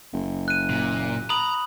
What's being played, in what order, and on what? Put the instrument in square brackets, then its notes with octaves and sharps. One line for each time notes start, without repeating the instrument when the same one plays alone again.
[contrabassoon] F#1
[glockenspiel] F#6 D#7
[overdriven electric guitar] A#2
[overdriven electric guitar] A#5 [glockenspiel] B5 D#6 F#7